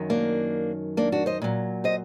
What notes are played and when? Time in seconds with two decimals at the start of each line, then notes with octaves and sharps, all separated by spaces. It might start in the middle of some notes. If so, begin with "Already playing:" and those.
Already playing: F#2 D#3 F#3
0.10 A#3 D4
0.97 A#3 D4
1.12 D4 F#4
1.26 C5 D#5
1.42 A#2 F#3
1.84 C5 D#5